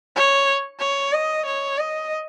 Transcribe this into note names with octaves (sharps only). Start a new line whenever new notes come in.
C#5
C#5
D#5
C#5
D#5